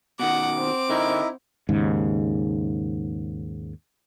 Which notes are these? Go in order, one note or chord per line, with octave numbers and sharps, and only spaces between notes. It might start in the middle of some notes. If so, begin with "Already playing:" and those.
B2 D#3 F#5 D6
C4
D3 D#4 E4 A#4
D#2 G#2 C#3